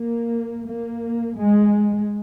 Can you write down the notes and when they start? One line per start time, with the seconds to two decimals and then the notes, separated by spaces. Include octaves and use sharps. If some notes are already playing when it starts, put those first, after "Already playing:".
Already playing: A#3
0.64 A#3
1.36 G#3